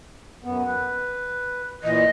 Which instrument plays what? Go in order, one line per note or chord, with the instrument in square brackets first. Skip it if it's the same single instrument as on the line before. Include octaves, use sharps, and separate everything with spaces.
[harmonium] F#2 B3
B4
[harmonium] A#2 E3 [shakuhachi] D#5